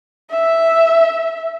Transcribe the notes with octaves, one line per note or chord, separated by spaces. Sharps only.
E5